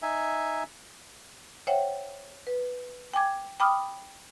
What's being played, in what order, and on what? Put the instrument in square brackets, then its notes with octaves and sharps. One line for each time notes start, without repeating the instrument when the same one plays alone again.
[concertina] D#4 E5 G#5
[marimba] C5 C#5 E5 F#5 G5
B4
G5 G#5 D6 G#6
G5 B5 D6 D#6 F6